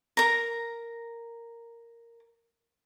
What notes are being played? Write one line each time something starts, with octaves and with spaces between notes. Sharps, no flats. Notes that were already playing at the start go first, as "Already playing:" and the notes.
A#4 A#5